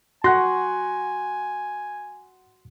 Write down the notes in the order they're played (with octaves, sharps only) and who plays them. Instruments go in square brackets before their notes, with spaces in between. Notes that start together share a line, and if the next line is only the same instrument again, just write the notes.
[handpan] F#4 [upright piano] F#5 F#6 A#6 [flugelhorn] G#5 [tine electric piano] C6